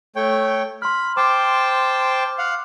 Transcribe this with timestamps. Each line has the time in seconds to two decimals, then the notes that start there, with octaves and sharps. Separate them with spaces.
0.16 A3 C#5 G5
0.82 B5 C6 F6
1.17 C5 G5 A5 D6
2.38 F5 F#5